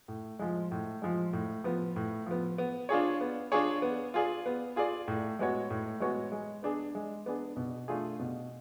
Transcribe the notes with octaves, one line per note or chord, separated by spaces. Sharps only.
A2
F3 G#3
A2
F3 G#3
A2
F3 B3
A2
F3 B3
B3
D4 F4 G#4 C#5
B3
D4 F4 G#4 C#5
B3
F4 G#4 D5
B3
F4 G#4 D5
A2
G#3 B3 F#4 C#5
A2
G#3 B3 F#4 C#5
G#3
B3 D4 G#4
G#3
B3 D4 G#4
B2
A3 D4 F4 G#4
B2